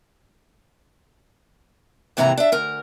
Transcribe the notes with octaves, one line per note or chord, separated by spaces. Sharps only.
D#2 G#2 C3 E3 E4 A#5
D4 E5
D2 A#4